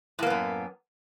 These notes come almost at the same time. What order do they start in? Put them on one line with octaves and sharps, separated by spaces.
A2 A#3 B3 F#2